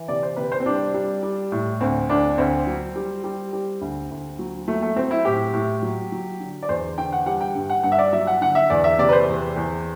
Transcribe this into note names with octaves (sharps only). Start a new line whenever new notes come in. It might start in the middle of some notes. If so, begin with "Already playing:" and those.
Already playing: E3
C3 D5
C5
C3 B4
C5
C4
G3 D4
G3
G3
A2
D2 C4
D2 D4
D2 C4
F#3
G3
G3
G3
D2
D2
F#3
F#3 A3
A3
F#3 C4
E4
A2 G4
A2
F#3
F#3
D3
D5
E2 C5
D3 G5
F#5
G3 F#5
G5
G2
F#5
G2 F#5
E5
D5
F#3 E5
F#5
D3 F#5
E5
E2 D5
E5
C3 D5
B4
C5
E2
E2